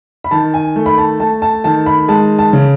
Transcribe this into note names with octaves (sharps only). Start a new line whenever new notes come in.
B5
D#3 A5
G#5
A3
B5
A5
A3 A5
A5
D#3 A5
B5
G#3 A5
A5
C#3